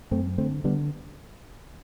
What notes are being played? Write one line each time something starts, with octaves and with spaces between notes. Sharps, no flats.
F#2 A3 C4
D3 A3 C4
D3 G3 B3